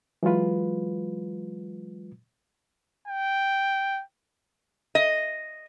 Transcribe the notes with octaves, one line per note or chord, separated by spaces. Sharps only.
E3 F#3 G#3 F4 B4
G5
D#5